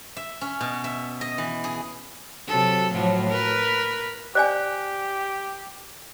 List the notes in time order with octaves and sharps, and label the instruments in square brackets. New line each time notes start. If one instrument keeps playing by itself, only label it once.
[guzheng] E5
C#4
B2
E5
D#5
E3
G#4
[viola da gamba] C3 F#3 A4
A2 F3 F#3
A#4 B4
[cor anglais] G4 [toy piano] C5 D5 G#5